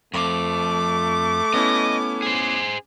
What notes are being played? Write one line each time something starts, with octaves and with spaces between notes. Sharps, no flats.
F2 F3 A3 D6
B3 C#4 E4 D#5
G#4 C5